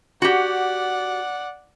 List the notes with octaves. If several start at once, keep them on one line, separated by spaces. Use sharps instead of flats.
F#4 G4 D5 F#5